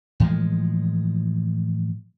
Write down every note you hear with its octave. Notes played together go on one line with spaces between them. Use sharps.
A2 E3 F3 G#3